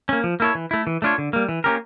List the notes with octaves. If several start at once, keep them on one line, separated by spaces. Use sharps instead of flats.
A#3 C#4
F3
A#3 E4 A4 C#5
E3
A3 E4
E3
A3 D4 F4 C#5
D3
G3 A#3
E3
A#3 C#4 G4 A#4